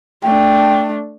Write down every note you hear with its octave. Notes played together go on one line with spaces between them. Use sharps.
A3 D4 G5